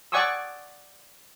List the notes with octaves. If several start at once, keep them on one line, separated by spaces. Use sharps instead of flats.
D5 F#5 G#5 C#6 D#6 E6